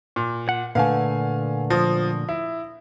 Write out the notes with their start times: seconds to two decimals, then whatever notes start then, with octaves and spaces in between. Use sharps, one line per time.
0.16 A#2
0.49 F#5
0.75 A#2 D3 A3 B4 F5 F#5 G#5
1.70 F3 D#6 A#6
2.29 E4